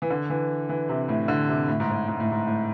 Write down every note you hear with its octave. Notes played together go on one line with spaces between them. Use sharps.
E3
D3
E3
E3
C3
A2
D3
C3
A2
G#2
A2
G#2
A2
G#2
A2